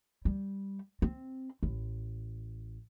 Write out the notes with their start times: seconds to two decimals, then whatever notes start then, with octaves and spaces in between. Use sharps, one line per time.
0.25 G3
1.02 C4
1.63 A1